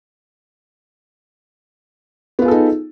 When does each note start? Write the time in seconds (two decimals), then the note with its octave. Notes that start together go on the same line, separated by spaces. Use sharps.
2.39 B3
2.42 F4
2.45 G#4
2.48 A4
2.51 D#4